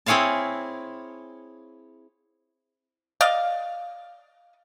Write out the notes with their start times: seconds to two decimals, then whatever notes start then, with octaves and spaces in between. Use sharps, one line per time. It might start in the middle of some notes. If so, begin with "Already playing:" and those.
0.06 C4 E4 G#4 C#5 F5 A5
3.21 D5 D#5 F5